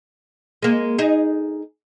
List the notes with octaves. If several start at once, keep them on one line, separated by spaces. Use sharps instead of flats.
G#3 A#3
D#4 G#4